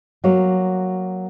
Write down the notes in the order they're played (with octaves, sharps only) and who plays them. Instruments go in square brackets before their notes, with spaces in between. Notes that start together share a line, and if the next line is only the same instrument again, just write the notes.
[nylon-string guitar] F#3 A#3 C#5